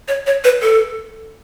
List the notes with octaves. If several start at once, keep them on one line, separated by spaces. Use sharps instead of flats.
C#5
C#5
B4
A4